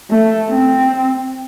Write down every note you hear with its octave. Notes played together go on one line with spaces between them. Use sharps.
A3
C4